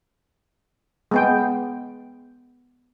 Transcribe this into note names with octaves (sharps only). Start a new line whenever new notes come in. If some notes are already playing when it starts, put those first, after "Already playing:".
G#3 B3 G5